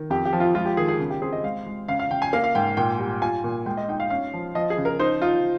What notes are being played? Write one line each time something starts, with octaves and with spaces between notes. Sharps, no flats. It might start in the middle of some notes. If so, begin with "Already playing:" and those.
Already playing: D#3
F2 G4
G4
F3
F4
G#3 F4
G4
D#3 G#4
G#4
C#3
G4
C4 G#4
D#5
G#3 F5
G#3
C#3 F5
F5
C#3 G5
G#5
A#3 F5
F5
G#2 G5
A#2 G5
G3
F4 G#5
A#2
G#3 G5
D#5
D#4 G5
F5
C#4 F5
F3
F3 D#5
G#4
C#3
A#4
D#4 C5
D#4 F4